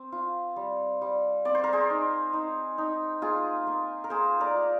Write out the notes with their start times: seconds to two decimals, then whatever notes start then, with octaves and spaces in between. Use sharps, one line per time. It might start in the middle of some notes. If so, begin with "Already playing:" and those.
Already playing: C4
0.12 F4
0.56 G3
1.02 G3
1.45 C4 D5
1.55 C5
1.64 A#4
1.73 G#4 C5
1.90 D#4
2.33 D#4
2.78 D#4
3.22 A#3 F4 G#4
3.67 A#3
4.04 A#4
4.10 A#3 G#4 C5
4.40 A#4 D5
4.55 F4